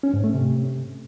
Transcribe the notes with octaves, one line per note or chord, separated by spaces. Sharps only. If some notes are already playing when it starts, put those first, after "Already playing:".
C#4
G#2
A3
C3